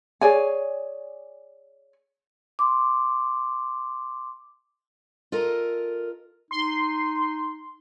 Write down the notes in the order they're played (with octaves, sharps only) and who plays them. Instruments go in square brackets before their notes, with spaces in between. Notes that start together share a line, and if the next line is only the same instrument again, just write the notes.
[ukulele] G#4 C#5 D5 G#5
[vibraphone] C6 D6
[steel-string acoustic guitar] F4 A4 A#4 D#5
[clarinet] D#4 [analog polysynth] C6